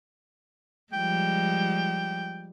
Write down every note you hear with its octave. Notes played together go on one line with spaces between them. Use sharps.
F3 G3 G#3 G5